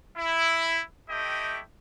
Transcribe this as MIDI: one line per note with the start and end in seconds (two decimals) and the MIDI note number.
0.17 0.79 64
1.09 1.60 57
1.09 1.60 64
1.09 1.60 67
1.09 1.60 75
1.09 1.60 79